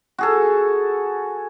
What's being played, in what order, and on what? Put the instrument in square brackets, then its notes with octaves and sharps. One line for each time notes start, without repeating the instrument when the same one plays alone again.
[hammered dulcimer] F#4 G#4 A4